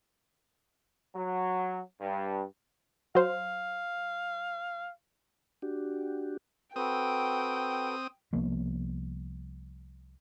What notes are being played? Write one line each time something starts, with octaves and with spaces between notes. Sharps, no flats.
F#3
G2
F#3 C5 F5
D4 F#4 G4
C4 F#4 A4 B4 G5 D#6
C2 F3 A#3 B3